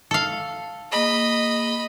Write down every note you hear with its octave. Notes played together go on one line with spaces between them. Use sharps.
A4 F5
A#3 G#4 D#5 B5